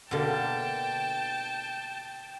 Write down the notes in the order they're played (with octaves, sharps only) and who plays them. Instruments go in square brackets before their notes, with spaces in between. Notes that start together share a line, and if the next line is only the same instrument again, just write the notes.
[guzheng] B2 D3 A#3 [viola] G5 A5